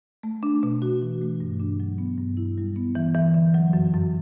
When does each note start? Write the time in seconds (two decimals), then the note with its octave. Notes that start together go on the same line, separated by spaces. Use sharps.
0.23 A3
0.43 D4
0.63 B2
0.82 F#4
1.02 E3
1.21 A3
1.40 G2
1.60 D4
1.80 F#3
1.98 B3
2.18 G2
2.37 E4
2.58 G3
2.76 B3
2.95 E3
3.15 E3
3.34 D3
3.54 F#3
3.73 F#2
3.94 F#2